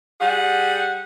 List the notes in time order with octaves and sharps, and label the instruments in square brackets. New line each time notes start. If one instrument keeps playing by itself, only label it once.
[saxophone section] G3 G#4 F#5